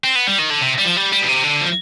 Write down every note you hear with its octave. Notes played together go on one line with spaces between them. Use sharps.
C4
B3
G3
D#3
D3
C3
G3
F3
G3
G3
B2
C3
D3
F3